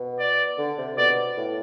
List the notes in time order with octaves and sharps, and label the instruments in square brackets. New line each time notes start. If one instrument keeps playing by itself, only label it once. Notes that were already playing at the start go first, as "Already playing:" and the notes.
Already playing: [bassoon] B2
[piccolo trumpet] D5
[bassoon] D3
C3
[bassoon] B2 [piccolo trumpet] D5
[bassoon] A2